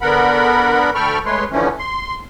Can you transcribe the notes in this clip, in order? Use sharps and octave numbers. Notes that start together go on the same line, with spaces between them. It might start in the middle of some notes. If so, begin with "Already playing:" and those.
D3 B3 A#4 F#5 B5
D2 A4 G5 B5 C#6 F6
G#3 A3 B4 C#5 C6
D3 E3 F3 A3 C#4
C6